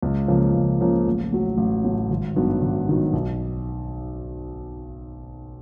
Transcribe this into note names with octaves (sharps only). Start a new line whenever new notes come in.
C#2
C#3 F3 A#3
C#2
C#3 F3 A#3
A1
A2 F#3
A1
A2 F#3
G#1
G2 D#3 F#3 B3
G#1
G2 D#3 F#3 B3
B1